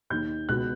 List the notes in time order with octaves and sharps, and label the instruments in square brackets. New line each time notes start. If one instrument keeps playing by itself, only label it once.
[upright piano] D#2 D#3 G6
C#2 B2 F#6